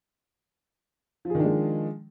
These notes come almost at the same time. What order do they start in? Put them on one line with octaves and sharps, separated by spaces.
F3 G#4 D#3 D4 G#3